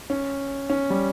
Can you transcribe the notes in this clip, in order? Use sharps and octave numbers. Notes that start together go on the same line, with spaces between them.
C#4
C#4
G3